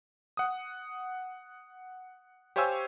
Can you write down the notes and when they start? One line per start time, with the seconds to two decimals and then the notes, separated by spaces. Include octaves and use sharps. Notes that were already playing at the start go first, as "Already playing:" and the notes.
0.37 F#5 D#6
2.56 G4 C5 C#5 F5 G#5 E6